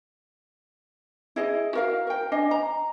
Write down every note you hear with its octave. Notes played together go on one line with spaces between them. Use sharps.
E4 G#4 D#5
F#4 A#4 F5
A#4 G5
D4 D#5 G#5
A#5